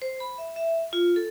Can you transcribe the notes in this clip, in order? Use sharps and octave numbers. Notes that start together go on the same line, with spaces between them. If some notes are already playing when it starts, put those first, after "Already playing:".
C5
B5
E5
E5
F4
A4